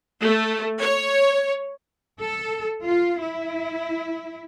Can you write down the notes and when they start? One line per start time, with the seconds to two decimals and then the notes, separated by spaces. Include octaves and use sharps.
0.21 A3
0.78 C#5
2.21 A4
2.84 F4
3.22 E4